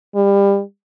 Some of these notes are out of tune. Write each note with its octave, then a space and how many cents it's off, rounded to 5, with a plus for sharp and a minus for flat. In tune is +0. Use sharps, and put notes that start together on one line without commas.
G3 +25